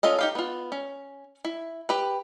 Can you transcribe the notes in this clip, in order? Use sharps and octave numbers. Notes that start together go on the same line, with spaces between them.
C#4 F4 A4 D#5
D#4 G4 F5
B3 F4
C#4
E4
G4 B4